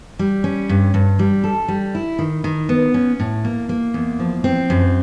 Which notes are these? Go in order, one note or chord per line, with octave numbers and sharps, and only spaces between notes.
G3
C#4
G2
G2
G3
A4
G3
E4
D#3
D#3
B3
C#4
A2
A#3
A#3
E2
F3
C4
F#2